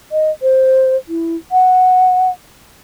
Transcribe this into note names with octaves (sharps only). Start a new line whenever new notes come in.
D#5
C5
E4
F#5